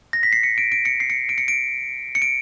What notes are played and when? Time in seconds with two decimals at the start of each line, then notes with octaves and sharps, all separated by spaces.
0.13 A#6
0.23 B6
0.33 C7
0.43 C#7
0.58 D7
0.72 D7
0.85 C#7
1.00 C7
1.10 C#7
1.29 D7
1.38 C#7
1.48 D7
2.15 C#7
2.22 D7